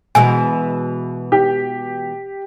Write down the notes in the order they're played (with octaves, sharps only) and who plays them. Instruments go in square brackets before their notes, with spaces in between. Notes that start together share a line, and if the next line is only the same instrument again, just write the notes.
[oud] B2 E3 G#3 [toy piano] G#5
[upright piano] G4